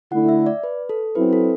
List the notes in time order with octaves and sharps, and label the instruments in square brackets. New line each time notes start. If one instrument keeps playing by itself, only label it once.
[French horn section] D3 A3 E4 [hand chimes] F#5
[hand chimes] E5
D5
B4
A4
[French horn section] F#3 C4 E4 [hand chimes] B4
[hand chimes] A4